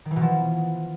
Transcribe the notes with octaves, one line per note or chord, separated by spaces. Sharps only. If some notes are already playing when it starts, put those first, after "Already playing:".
D#3
E3
B2
F3